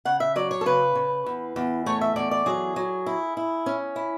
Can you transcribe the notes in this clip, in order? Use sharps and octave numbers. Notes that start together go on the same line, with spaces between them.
C#3 F#5
E5
F#3 D5
C#5
A4
C#3 B4
C#3
E2
E2
A3 C#5
E5
E2 D5
D5
F#3 G#4
F#3
E4
E4
C#4
E4